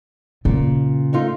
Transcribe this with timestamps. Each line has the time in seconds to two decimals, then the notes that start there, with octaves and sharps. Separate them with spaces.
0.45 A#2 C#3
1.13 A3 D#4 F4